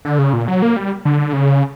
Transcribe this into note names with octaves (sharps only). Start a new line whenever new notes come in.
D3
C#3
A#2
F#3
A#3
G3
D3
C#3